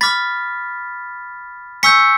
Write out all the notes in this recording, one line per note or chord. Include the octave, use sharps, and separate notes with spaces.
B5 D6 F6 A6 B6
G#5 C#6 E6 G6 B6 C#7